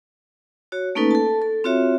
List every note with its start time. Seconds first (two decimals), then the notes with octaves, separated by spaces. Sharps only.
0.72 F#4 C#5
0.95 A3 A#3 C#4 D#4 A4 B4
1.11 A4 A5
1.42 A4
1.64 C4 F4 F#4 C#5 E5